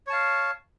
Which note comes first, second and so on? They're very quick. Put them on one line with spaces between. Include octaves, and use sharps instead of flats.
C#5 A5 F5